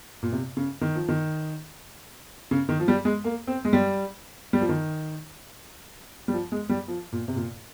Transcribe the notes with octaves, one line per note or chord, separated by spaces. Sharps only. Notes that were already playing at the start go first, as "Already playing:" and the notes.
A#2
C3
C#3
D#3
F3
D#3
C#3
D#3
F3
G3
G#3
A#3
C4
G#3
G3
G3
F3
D#3
G3
F3
G#3
G3
F3
A#2
C3
A#2